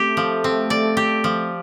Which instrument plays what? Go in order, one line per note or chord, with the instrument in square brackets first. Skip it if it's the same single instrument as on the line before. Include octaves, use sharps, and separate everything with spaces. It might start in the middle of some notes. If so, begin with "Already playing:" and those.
Already playing: [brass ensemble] A3 [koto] C4 G4
[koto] F3
C4
D5
G4
F3